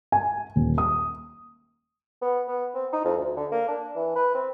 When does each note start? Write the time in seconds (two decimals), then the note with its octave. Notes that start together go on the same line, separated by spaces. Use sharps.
0.12 G#5
0.56 D#1
0.78 D#6
2.22 B3
2.48 B3
2.74 C4
2.93 D#4
3.04 F2
3.16 D2
3.37 D3
3.51 A#3
3.68 D4
3.95 E3
4.16 B4
4.34 C4